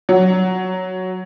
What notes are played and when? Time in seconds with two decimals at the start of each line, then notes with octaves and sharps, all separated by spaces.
0.09 F#3